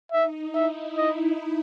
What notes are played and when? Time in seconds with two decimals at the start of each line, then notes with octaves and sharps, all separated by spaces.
0.12 D#4 E5
0.54 E4 E5
0.97 D#5